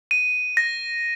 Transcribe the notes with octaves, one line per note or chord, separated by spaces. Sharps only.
D#7
A#6